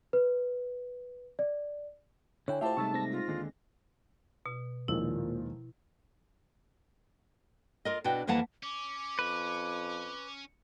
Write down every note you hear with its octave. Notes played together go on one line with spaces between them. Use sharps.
B4
D5
D3 E4 C#5 G5 G#5
A2 F4 G4 C5 E5 A5
G#2 C3 G3 A3 C#6 E6 A6
C4 A#6
F4
D#2 D3 G#3
B2
D#2 A#2 D#3 F3 G#3 E4
F4 A#4 D#5
B2 D4 E4 F#4 G5
F2 E3 A#3 F5 F#5 A5
C#4 D6
F2 B4